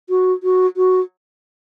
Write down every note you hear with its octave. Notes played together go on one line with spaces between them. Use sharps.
F#4
F#4
F#4